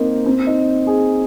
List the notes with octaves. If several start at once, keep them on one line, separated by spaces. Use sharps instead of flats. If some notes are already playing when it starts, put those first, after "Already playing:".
Already playing: A#3 C4 D#4
C4
D#4
G#4